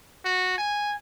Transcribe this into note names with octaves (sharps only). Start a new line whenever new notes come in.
F#4
G#5